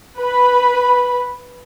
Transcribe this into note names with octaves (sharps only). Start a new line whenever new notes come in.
B4 B5